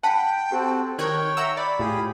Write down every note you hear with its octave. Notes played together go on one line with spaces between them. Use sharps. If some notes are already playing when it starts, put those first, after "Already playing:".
F#5 G5 A5 B5
C4 F#4 G4 A4
D#3 A#4 C#5 G5 F#6 G#6
E5 F#5 A#5 E6
D5 B5
A2 F4 G4 G#4